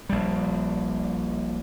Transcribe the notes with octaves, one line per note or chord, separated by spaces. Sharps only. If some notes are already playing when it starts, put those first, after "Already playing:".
A#1 G3